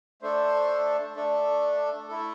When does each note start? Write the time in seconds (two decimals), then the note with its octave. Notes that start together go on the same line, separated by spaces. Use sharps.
0.22 A3 D4 A4 C5
1.15 A3 D4 A4
2.08 A3 E4 A4